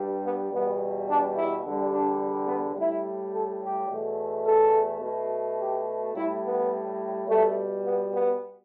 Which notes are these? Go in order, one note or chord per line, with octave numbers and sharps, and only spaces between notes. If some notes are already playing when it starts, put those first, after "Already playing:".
Already playing: G2 G3
B3
E2 B2 G3 B3
D4
E4
E2 D3 G3
D4
B3
A2 G3 E4
A4
G4
E2 B2 A3
A4
B2 A3
G4
A2 G3 E4
B3
B2 G3 A3
B3
B3